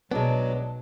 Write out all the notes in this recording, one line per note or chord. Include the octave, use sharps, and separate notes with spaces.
B1 F#3 G#3 B3 D4